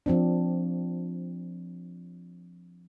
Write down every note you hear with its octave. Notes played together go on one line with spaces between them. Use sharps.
F3 C4 D4